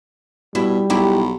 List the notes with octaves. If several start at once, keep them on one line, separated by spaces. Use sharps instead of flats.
B2 G3 E4
B1 E4 G4